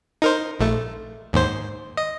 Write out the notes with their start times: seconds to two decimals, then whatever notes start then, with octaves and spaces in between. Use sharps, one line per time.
0.22 D#4 A#4 C5
0.59 A#1 A3
1.33 D#2 G#2 C5
1.97 D#5